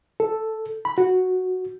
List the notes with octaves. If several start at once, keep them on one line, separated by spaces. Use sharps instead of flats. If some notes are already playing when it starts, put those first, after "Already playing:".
A4
B5
F#4